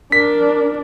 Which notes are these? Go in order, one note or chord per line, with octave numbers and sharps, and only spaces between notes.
D4 A#4 B6